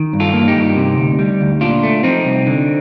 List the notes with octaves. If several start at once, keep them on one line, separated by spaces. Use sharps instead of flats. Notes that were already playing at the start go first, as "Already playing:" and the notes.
Already playing: D#3
G2
F4 A4
A#3
D#4 G4
G2
C3
D2
G3
D2
A#2 D4 F4
A3
F3 C4 D#4
C2
D3